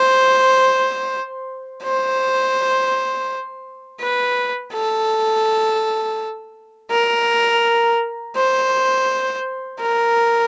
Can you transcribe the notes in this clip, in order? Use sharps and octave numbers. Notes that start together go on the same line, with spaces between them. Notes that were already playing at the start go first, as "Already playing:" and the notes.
Already playing: C5
C5
B4
A4
A#4
C5
A#4